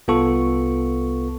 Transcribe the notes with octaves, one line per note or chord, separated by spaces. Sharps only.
C2 B3 F4 A4 C#6